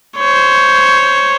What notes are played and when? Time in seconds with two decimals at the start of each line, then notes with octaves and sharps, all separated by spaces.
0.17 C5 C#5